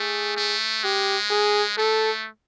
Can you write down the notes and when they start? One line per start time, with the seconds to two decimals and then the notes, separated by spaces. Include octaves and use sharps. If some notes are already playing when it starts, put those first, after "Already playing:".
Already playing: A3 G#4
0.36 A3
0.84 G#3 G4
1.30 G#4
1.78 A3 A4